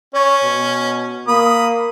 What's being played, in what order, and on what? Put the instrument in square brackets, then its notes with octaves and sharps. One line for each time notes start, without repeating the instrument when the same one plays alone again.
[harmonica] C#4 [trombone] C#5
[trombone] B2
[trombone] A#3 [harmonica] B5 D#6